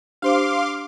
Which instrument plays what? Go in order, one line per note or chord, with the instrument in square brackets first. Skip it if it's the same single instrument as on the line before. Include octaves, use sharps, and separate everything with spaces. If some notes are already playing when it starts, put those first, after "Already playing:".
[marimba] D4 G4 C5 [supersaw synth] F5 C6 D6